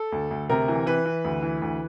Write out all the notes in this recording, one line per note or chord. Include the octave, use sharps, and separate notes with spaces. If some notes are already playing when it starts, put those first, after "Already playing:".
Already playing: A4
D2
D2
C3 A#4
E3
E3 B4
E3
D2
E3
D2